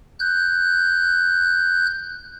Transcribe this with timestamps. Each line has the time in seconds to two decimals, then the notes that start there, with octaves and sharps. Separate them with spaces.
0.19 F#6 G6